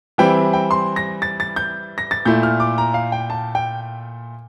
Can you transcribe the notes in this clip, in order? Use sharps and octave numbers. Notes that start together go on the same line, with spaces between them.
E3 G3 C4 E4 G5
G5
C6
A#6
A6
A6
G6
A#6
A6
A#2 A3 E4 G6
F6
D6
A#5
F5
G5
A5
G5